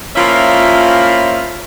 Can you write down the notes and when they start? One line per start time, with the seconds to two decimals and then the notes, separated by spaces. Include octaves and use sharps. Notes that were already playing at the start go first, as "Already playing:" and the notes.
0.16 F3 A#3 C#4 E4 F4 E5